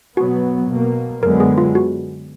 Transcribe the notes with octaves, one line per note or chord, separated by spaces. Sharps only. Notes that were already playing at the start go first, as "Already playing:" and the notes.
B2 F#3 B3 F#4
B2 A#3
F#2 D3 G#3 B3 A#4
G#4
F4
F#4